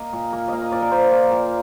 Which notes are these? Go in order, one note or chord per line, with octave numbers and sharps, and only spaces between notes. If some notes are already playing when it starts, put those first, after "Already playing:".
Already playing: A#3 D#5 F5
A#2
A#3
A#3 D#5 F5
D#5
A#2 D5
A#4
A#2 C5
A#3
A#2